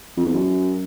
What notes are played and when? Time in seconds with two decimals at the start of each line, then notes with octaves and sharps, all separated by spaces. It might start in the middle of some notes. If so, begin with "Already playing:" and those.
0.17 F2
0.25 E2
0.34 F#2